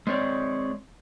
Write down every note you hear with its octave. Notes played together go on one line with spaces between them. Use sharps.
G#3 C4 C#5 D5